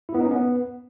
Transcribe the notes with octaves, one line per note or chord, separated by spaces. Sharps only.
E4
B3
D#4
C#4
B3